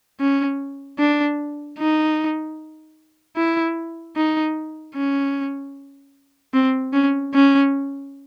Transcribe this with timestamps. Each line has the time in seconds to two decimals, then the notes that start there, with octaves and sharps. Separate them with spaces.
0.20 C#4
0.99 D4
1.79 D#4
3.37 E4
4.16 D#4
4.96 C#4
6.54 C4
6.93 C#4
7.34 C#4